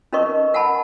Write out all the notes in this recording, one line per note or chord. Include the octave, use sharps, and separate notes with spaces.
C#4 D#4 A#4 B4 D#5 C#6
A#4 F#5 G#5 A5 B5